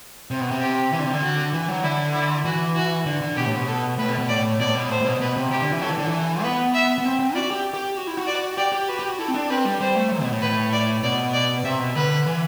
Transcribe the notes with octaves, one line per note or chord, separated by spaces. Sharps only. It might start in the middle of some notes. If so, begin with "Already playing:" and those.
C3
B2
C3
G4
E3
D3
C3
D3
F#4
E3
F#3
D3 E4
E4
E3 F#4
F#4
D3
D3
B2 G4
A2
B2
A4
A2 B4
B2
B2
A2 D5
B2 D5
A2
B2
A2 C5
A2
B2
B2 B4
C3
C3 G4
D3
E3
F#3 A4
E3
D3
E3
B3 B4
E5
B3
C4
C4
F#4 D5
G4
G4
F#4
E4
F#4
D5
G4 D5
G4
F#4 B4
G4
F#4
E4 A4
C4
D4
C4 B4
G3
G3 C5
A3
F#3
B2
A2
B4
D5
B2 D5
D5
C3 E5
B2
D3 B4
E3